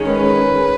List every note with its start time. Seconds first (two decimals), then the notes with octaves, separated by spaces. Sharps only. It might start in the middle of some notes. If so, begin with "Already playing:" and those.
Already playing: D#3 G#3 C#4
0.11 B4